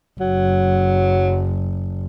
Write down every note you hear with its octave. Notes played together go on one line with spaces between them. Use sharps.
F#1 F#3